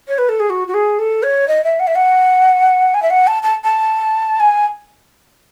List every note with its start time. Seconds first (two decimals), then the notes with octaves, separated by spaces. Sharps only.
0.08 C#5
0.18 B4
0.29 A4
0.40 G#4
0.50 F#4
0.68 F#4
0.74 G#4
0.99 A4
1.23 C#5
1.48 D#5
1.64 E5
1.80 F#5
1.87 E5
1.95 F#5
2.94 G#5
3.02 E5
3.10 F#5
3.27 A5
3.43 A5
3.64 A5
4.40 G#5